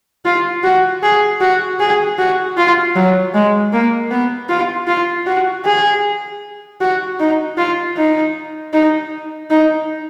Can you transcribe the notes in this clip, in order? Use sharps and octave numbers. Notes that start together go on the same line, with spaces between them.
F4
F#4
G#4
F#4
G#4
F#4
F4
F#3
G#3
A#3
B3
F4
F4
F#4
G#4
F#4
D#4
F4
D#4
D#4
D#4